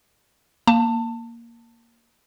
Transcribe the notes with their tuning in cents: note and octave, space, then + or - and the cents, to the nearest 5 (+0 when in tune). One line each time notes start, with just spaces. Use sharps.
A#3 +0 A5 +20